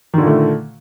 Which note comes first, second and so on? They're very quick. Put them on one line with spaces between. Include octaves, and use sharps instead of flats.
D#3 D3 A#2 A3